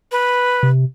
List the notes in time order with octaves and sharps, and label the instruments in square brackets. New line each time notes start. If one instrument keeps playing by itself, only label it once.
[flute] B4
[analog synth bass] C3